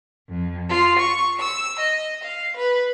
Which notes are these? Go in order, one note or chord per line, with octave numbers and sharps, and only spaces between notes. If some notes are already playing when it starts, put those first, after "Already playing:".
F2
F4
C#6
E6
D#5
F5
B4